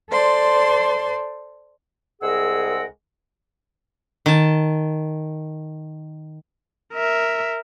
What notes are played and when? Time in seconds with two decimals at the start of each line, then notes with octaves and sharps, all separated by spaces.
0.10 A4 C5 D5 C6
2.22 C2 G#3 G#4 A#4 F#5 E6
4.26 D#3 A5
6.93 A#4 E5